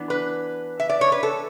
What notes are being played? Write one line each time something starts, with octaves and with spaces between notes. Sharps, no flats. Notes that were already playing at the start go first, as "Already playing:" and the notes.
Already playing: E3 B3 D4
B4
E5
D5
C#5
B4
A4